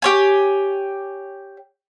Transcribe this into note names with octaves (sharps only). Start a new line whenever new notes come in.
G4 C#5 G#5